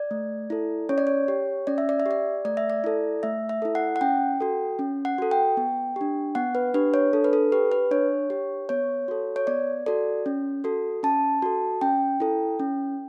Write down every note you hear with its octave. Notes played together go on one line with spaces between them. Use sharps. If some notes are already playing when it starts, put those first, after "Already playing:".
Already playing: D5
A3
E4 A4
C#4 C#5
D5
C#5
G4
C#4 D5
E5
D5
E5
G4
D5
A3 D5
E5
D5
E4 A4
A3 E5
E5
E4 A4
F#5
F#5
C#4 G5
F#4 A4
C#4
F#5
F#4 A4
G5
B3
D4 G4
B3 F#5
B4
D4 G4 B4
C#5
D4 A4
B4
A4
G4 B4
B4
D4 C#5
G4
B3 C#5
F#4 A4
C#5
B3 D5
F#4 A4 D5
C#4
F#4 A4
C#4 A5
F#4 A4
C#4 G5
E4 A4
C#4